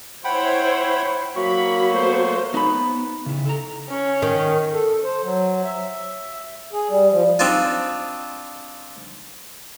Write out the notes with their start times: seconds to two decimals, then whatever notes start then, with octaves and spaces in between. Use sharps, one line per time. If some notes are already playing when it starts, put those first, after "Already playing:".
0.24 E4 C5 C#5 F#5 G5 B5
1.36 F#3 A#3 F#4 B5 C#6
1.92 A3 B3 C5
2.54 B3 D#4 B5
3.26 C#3 E4
3.45 A4 A#5
3.89 C#4 C#5
4.22 D#3
4.73 A4
5.03 C5
5.24 F#3
5.64 E5
6.73 G#4
6.90 G3
7.11 F3
7.39 C4 D4 D#4 F4